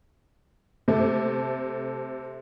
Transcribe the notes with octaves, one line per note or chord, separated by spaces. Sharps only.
C3 A3